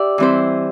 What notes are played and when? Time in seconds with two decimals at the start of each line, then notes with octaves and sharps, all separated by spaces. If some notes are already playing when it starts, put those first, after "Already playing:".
Already playing: G4 D5 E5
0.18 E3 G3 C4 E4 C5